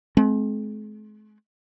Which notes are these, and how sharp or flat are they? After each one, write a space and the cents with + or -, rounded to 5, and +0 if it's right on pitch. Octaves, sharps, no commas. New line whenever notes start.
G#3 +45 C4 +0